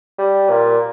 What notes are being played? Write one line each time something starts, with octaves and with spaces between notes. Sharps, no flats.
G3
A#2